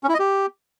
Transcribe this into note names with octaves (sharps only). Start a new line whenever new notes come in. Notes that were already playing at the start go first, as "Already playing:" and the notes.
C#4
E4
D#5
G4